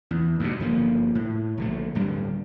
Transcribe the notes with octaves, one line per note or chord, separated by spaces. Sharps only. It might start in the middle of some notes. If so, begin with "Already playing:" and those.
E2
D2 G2 B2
G1 D3 F3 A#3
A2
A#1 D3 A3
D1 G2 D3 G3